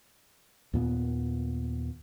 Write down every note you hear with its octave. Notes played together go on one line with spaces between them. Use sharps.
D#2 A#2 B3